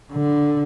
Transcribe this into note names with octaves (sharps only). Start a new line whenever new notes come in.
D3